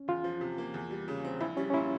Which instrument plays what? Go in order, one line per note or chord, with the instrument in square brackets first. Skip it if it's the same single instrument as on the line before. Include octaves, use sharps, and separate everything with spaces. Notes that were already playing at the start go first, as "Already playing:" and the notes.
Already playing: [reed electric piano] C#4
[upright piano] E2 [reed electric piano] F4
[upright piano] F3
C3
A#3
E2
G3
C#3
C4
[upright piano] A#1 [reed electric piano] E4
[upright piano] G3 [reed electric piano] C#4
[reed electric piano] C#4
[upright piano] A#2 [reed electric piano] E4